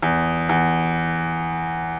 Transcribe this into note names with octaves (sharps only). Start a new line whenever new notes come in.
E2
E2